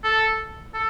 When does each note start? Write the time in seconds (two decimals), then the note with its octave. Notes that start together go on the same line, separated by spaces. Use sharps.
0.04 A4
0.74 A4